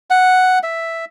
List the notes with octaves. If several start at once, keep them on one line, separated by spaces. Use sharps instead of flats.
F#5
E5